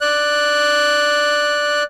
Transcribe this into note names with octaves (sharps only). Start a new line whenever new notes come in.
D5 F#6